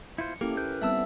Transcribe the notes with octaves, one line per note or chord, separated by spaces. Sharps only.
E4 F4 C5 C#7
A#3 C#4 E4 G4 A4
A#4 B4 G6
G3 B3 C4 E5 A5 E6